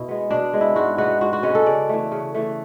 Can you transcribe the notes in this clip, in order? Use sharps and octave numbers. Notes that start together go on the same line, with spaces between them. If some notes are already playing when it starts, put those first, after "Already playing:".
Already playing: B2 E4
G#3 B3
B2 D4
G#3 B3
E4
G#2 F#4
G#3 B3 F#4
G#2 F#4
F#4
G#3 B3 C#4
A4
C#3 D5
E3 A3
C#3
E3 A3